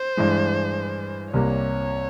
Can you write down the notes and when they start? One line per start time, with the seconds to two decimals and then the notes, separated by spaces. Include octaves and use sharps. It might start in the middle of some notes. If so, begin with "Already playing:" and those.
Already playing: C5
0.17 G2 E3 G#3
1.33 C2 C3 G3 A#3 C#5